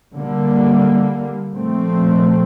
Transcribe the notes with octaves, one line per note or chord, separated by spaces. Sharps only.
D3 G3 A#3
A#2 F3 A3 C4